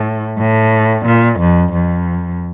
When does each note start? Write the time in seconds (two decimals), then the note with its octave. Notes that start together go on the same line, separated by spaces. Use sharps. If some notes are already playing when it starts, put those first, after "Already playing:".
Already playing: A2
0.39 A2
1.05 A#2
1.40 F2
1.73 F2